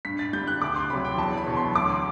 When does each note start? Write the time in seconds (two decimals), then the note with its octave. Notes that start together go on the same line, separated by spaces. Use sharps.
0.05 G2 B6
0.19 A6
0.33 D3 G3 G6
0.47 F#6
0.62 D2 D6
0.76 C6
0.90 C3 F#3 B5
1.04 G5
1.18 E2 A5
1.37 B5
1.46 B2 F#3
1.57 C6
1.76 D2 D6